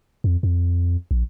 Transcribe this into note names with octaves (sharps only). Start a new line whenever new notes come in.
F2
F2
A#1